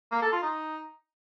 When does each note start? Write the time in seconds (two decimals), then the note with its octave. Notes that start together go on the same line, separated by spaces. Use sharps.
0.11 A#3
0.22 A4
0.32 F4
0.42 D#4